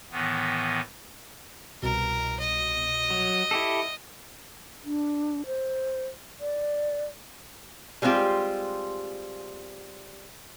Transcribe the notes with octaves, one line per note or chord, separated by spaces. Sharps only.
A2 D#3 E3 B3
C2 B2 A#4
D#5
F#3
E4 G4 A4
D4
C5
D5
G3 G#3 B3 C4 F4 G4